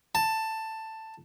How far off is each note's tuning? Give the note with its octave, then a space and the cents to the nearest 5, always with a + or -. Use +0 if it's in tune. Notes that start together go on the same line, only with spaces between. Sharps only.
A5 +10